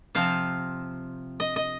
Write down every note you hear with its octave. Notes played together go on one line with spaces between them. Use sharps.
C3 F3 C4 F5
D#5
D#5